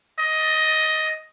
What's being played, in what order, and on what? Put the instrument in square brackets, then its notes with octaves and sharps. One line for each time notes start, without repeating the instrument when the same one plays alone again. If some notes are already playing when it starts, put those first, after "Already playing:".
[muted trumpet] D#5